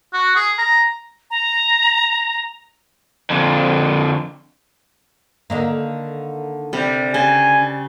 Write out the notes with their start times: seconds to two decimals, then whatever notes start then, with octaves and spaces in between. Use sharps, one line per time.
0.13 F#4
0.36 G#4
0.58 A#5
1.30 A#5
3.30 F2 D3
5.50 D3 D#3 A#3
6.73 C3 G3
7.14 C#3 C5 G#5